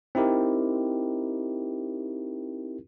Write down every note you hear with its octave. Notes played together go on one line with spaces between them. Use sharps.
C4 D#4 E4 G4 A#4